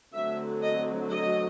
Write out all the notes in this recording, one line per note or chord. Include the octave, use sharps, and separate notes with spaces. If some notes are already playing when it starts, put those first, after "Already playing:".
D3 F#3 A3 C4 E5
D#5
D#5